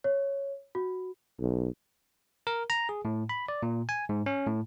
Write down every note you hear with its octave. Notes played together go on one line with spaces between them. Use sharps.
C#5
F#4
B1
A#4
A#5
G#4
A2
B5
D5
A#2
G#5
G#2
C#4
A2